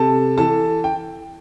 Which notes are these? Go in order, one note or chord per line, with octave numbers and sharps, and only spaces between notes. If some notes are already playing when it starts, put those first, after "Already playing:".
Already playing: C3 A4 A5
E3 A4 A5
G5